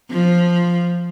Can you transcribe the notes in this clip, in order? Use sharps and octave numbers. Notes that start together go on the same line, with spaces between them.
F3